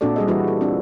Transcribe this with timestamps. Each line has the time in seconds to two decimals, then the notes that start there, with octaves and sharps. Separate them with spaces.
0.01 A#2 C4 D4 F#4 A4 D5
0.16 G3 G#4 D#5
0.28 E3 G3 E4 F#4 B4
0.48 A4
0.61 C4 D4 F4